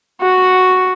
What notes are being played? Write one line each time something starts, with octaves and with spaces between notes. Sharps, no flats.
F#4 F#5